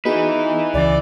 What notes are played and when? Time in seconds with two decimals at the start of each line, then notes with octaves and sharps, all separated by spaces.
0.05 B3 D#4 E4 F#4 G#4 B4
0.74 C#2 C#3 E3 D5